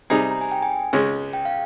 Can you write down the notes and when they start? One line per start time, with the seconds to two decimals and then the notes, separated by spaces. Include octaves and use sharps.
0.10 C3 G3 C4 D#4 G#4 A#5
0.31 A#5
0.41 G#5
0.52 G5
0.62 G#5
0.93 C#2 C#3 G#3 C#4
1.33 G5
1.45 F5